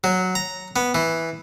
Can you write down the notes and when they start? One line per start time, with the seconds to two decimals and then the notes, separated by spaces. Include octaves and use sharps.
0.04 F#3
0.35 A#5
0.76 B3
0.95 E3